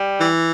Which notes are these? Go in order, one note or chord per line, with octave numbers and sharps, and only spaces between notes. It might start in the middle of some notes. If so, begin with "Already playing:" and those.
Already playing: G3
E3